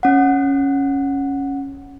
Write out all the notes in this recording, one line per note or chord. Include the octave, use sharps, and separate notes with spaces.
C#4 F#5